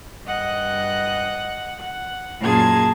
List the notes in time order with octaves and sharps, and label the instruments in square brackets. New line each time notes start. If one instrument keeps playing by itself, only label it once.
[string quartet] G2 D#5 F#5 F#6
F#5
F#2 A#2 A#3 G#4 A5 G#6